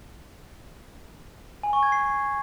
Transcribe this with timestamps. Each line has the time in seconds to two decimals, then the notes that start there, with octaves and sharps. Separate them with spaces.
1.63 G#5
1.73 C#6
1.83 G#6
1.92 C7